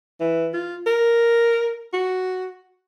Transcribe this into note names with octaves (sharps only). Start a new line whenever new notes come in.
E3
F4
A#4
F#4